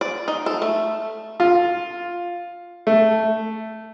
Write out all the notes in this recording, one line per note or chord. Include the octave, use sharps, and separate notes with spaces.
D5
D#4
A4
A3
F4
A3